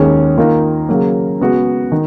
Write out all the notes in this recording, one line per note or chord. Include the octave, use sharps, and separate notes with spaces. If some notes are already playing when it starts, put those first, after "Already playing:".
Already playing: D#2 D#3 G#3 C#4
D#3 A#3 F4
C#3 F#3 A#3
C#3 G#3 B3 F#4
D#3